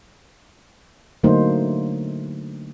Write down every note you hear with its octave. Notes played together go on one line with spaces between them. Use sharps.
D3 F#3 A3 A#3 D#4 C5